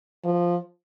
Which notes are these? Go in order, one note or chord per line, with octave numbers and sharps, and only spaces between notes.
F3